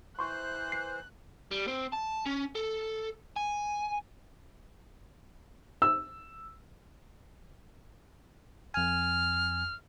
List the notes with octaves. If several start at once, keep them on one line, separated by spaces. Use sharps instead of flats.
E3 C5 C6 C#6 F#6
C7
G3
C4
A5
C#4
A4
G#5
E6
F2 G#5 F6